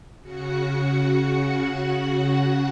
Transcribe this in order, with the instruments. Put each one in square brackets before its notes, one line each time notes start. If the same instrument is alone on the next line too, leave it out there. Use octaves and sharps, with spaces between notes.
[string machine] C#3 F#4 F#5